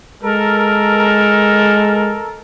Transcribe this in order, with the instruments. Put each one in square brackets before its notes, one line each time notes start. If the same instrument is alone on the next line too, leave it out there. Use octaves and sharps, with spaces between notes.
[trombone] G#3 [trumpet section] A4 A#4